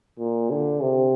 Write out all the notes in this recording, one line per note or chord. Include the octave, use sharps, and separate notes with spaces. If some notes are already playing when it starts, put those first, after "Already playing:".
A#2
D3
C3